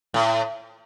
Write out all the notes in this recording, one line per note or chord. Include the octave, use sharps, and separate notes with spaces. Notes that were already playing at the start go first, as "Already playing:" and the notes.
A2